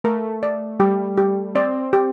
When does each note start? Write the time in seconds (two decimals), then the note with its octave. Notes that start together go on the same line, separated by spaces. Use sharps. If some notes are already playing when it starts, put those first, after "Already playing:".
0.04 A3 A#4
0.43 D5
0.79 G3 G4
1.17 G4
1.55 C4 D5
1.93 G4